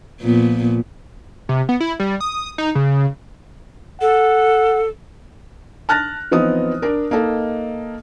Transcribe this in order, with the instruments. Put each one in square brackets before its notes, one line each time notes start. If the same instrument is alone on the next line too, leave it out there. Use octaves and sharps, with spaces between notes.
[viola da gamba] A#2 F3 B3
[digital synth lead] C3
B3
E4
G3
D#6
D#4
C#3
[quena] A4 [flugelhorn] F#5
[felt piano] A5 F6 F#6 A6 A#6
E3 F3 B3 C4 D#4 D#6
D4 A#4
A#3 D#4 A4 D#5